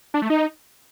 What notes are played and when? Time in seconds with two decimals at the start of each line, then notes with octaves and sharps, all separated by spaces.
0.14 D4
0.22 A3
0.30 D#4